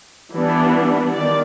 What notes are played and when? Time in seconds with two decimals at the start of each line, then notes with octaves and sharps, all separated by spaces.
0.33 E3 G3 B3 D4
1.13 D#3 D5